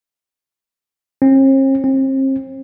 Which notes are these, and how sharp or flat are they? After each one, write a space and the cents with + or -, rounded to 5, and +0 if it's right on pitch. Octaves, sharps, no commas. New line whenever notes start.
C4 +45
C4 +35